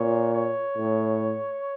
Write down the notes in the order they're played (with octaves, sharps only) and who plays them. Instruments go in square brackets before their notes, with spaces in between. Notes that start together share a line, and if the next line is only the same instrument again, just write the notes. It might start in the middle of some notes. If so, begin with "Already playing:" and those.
Already playing: [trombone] A#2 [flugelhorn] C#5
[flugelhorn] C#5
[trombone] A2